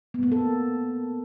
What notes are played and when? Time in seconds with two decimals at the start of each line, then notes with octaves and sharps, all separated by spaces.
0.14 B3
0.23 A#3
0.32 A4